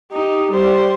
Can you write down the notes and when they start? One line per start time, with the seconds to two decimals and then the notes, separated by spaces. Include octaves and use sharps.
0.13 D#4 G4
0.52 G3 C5